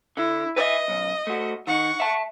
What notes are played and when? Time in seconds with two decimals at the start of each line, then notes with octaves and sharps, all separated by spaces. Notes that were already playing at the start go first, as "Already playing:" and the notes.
0.17 D3 E4
0.56 B4 D#5 E5
0.88 B1 F#2
1.27 A3 F#4
1.67 D#3 D#4 F#5 C#6
2.00 E5 A5